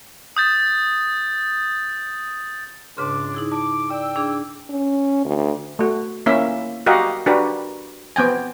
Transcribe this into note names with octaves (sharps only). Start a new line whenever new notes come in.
D#6 G6 A6
C#2 G#2 C#3 D4 C6 D6
D#4 E4 G#4
A5 D6
D5 G5 E6
D4 G#4 D6
C#4
D2
A3 F#4
A#3 C#4 E4 E5
F#4 G4 A#4 D#5 F5 F#5
D4 F#4 G4 A#4 B4
B3 C4 G5 G#5